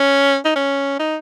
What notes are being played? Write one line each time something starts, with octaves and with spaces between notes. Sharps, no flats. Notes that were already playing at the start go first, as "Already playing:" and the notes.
Already playing: C#4
D#4
C#4
D#4